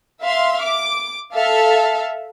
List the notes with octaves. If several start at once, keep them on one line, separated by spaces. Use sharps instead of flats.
E5 F5 C6
D6
A4 E5 F5